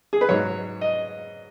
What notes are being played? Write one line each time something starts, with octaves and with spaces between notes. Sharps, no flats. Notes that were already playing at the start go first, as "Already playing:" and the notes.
G#4
B4
G#2 F#3 C#5
D#5